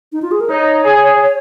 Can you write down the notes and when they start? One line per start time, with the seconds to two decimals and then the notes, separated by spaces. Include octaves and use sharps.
0.13 D#4
0.22 F4
0.31 G#4
0.41 A#4
0.50 D#4 C#5
0.85 G#4